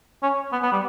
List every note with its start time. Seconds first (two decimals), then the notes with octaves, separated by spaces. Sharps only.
0.23 C#4
0.52 B3
0.62 B3
0.72 G3